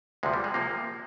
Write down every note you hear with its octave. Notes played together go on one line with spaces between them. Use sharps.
D2 C3 F3 G#3
G3
G#3
C3 F3 A#3